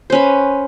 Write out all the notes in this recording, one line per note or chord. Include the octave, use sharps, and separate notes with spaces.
C#4 B4 C5